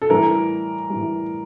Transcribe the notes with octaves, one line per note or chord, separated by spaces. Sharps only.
A4
A2 E3 G3 A#4
A2 E3 G3